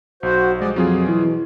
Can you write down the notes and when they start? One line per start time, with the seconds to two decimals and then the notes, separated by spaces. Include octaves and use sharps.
0.23 B1 F#4 C5
0.61 F3 G3 G#3 D5 D#5
0.76 F2 B2 F#3 F4 G#4
1.08 E3